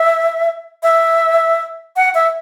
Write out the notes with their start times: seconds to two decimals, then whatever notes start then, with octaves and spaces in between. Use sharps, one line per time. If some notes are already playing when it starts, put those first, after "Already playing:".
Already playing: E5
0.83 E5
1.96 F#5
2.15 E5